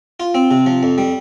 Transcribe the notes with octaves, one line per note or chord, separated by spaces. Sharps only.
F4
C4
C3
F3
F2
G3